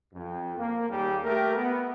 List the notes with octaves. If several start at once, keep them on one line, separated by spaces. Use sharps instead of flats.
F2
A#3
D#2 G3 G4 G#4
A3 G4 A#4
B3